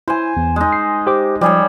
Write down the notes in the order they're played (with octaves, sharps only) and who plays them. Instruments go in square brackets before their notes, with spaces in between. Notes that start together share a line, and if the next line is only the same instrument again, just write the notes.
[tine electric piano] E4 [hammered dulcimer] C5 G#5
[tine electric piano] E2
[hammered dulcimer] G#3 D#4
[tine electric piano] C7
G4 C5 D6
[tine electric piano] F3 [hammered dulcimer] G3 G#4 C#5